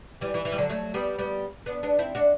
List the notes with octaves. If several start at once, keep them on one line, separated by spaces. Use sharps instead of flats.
E3 G3
E3
E3
G3
D3 F#3
F#3 A3
G3 B3
G3 B3
B3 D4
B3 D4
C4 E4
D4 F#4